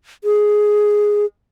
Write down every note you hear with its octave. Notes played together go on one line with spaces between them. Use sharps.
G#4